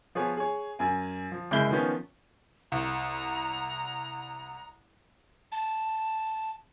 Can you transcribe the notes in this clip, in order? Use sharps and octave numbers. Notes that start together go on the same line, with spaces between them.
F3 B3 G#4 B4 C#5
G#4 C#5
F#2 G#5
F3
F#1 G#3 E4 B5 G6 G7
D#3 F3 B3 C#4
C2 A#5
A5